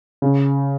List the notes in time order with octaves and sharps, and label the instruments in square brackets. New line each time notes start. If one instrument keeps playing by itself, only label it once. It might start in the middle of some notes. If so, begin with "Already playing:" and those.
[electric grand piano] C#3